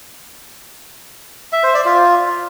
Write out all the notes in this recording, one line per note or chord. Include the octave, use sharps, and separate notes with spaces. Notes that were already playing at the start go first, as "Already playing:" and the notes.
E5
C5
D5
F4